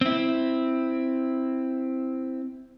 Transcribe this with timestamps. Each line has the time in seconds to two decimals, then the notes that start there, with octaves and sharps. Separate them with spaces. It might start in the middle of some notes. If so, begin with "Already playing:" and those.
0.01 C4 E4